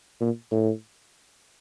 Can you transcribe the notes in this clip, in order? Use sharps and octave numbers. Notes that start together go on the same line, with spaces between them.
A#2
A2